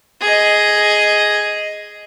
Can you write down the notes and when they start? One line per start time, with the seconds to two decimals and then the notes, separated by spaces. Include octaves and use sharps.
0.21 G#4 D#5